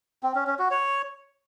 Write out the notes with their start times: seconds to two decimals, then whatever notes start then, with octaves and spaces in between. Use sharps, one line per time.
0.23 C4
0.35 C#4
0.47 C#4
0.59 F#4
0.71 C#5